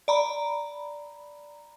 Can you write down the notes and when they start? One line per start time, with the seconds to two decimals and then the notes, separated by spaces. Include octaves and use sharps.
0.08 D5 A#5 B5